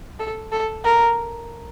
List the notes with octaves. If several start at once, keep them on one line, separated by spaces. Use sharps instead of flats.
A4
A4
A#4